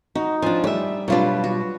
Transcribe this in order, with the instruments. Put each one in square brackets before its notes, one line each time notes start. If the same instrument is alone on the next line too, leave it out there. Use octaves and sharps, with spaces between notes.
[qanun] D#4 [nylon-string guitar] F#4
[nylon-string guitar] F3 D4 [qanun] G#5
[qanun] G3 [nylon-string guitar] C#5 E5
[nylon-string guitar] B2 G3 D4 [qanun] F#3 F4 B4
[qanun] F#4